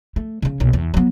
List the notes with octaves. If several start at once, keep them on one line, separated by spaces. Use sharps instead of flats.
A3
C#3 C#4
B1 A#3
E2
F#3 B3